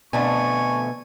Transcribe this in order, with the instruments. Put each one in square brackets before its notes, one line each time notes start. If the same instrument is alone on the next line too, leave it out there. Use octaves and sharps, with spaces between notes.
[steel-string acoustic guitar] F2 D3 A3 [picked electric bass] B2 [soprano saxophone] G#5 [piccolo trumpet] C#6